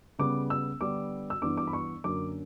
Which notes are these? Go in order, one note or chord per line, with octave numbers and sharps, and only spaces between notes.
C#3 G3 B3 D6
E6
D3 G3 B3 D4 D6
E6
G2 E3 B3 D4 D6
D6
B5
C#6
F#2 D3 F#3 A#3 D6